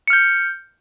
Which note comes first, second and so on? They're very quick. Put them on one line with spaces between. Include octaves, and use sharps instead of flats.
C#7 F6 G6